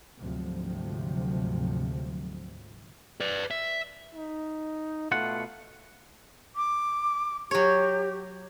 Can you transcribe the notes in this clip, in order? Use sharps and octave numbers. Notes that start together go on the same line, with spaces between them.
D2 G#2 C3 F3 F#3
B4 D5
E5
D#4
B2 A3 F4 F#5
D6
F#3 G4 C#5